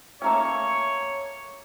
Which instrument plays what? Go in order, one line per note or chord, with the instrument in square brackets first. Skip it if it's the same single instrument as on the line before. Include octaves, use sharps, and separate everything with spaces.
[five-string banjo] A3 A#3 C#4 [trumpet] C#5